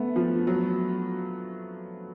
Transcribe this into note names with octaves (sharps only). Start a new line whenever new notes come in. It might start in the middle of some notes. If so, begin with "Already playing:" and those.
Already playing: A3 B3
F3
F#3